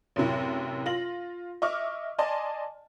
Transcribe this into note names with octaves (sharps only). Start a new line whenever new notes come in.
A1 F#2 C3 E4
F4 A#6 F#7
D#5 E5 C#6 D6 F6
D5 D#5 G#5 A5 C6